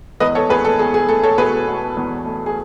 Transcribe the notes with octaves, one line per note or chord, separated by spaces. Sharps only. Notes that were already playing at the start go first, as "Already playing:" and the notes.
E2 B4 D#5
A4 C#5
E2 G#4 B4
A4
E2 G#4
G#4
A3 A4
A4 C#5
B2 G#4 B4
B2
E2
A3
G#4